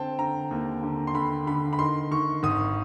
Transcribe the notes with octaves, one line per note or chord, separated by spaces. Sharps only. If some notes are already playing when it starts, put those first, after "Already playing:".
Already playing: D3 C4 G5 A5
D3 A#5
D#2
D3
C6
D3 B5
D3 B5
B5
D#3 C6
D#3 C#6
G#1 D#6